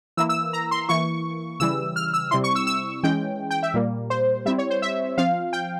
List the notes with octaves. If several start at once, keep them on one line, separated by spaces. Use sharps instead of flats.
E3 A#3 E4 E6
E6
A#5
C6
E3 A#3 E4 C#6
C#3 E3 G3 E6
F6
E6
C3 G3 C4 E4 C6
C#6
E6
E6
E3 G#3 C#4 G5
G5
E5
A#2 G3 A#3
C5
G3 C4 E4 E5
C#5
C5
E5
F3 C4 F4 F5
G5